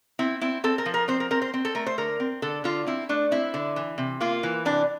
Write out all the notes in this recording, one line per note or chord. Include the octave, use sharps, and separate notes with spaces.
C4 E4
C4 E4
C4 A4
A#4
F3
A#4
C4 C5
A#4
C4 A#4
C5
C4
A4
A3 A#4
C5
D3 A#4
C4
D3 A4
D3 F4
C4 E4
A3 D4
C4 E4
D3
E3
C3
A#3 F4
E3
C3 D4